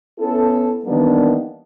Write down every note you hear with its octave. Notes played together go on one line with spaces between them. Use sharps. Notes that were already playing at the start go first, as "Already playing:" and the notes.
B3 C#4 E4 A4
D#3 E3 G3 A#3 B3 D4